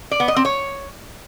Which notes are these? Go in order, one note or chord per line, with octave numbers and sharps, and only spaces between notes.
D5
B3
D#5
C4
C#5